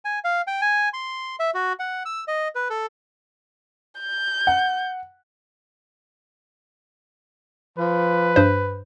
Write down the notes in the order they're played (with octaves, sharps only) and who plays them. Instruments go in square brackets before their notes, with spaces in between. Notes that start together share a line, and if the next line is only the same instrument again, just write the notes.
[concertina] G#5
F5
G5
G#5
C6
E5
F#4
F#5
E6
D#5
B4
A4
[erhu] G6
[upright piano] F#5
[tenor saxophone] F3 [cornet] B4
[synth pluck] G2 C5